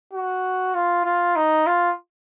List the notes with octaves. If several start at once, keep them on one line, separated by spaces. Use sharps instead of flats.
F#4
F4
F4
D#4
F4